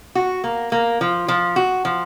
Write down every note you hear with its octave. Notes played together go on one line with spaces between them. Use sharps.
F#4
A#3
A#3
F3
F3
F#4
F3